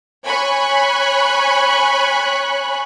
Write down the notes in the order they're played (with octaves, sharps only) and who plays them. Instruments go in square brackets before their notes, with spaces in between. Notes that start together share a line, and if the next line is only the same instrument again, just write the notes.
[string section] C#5 G#5 B5 C#6 F#6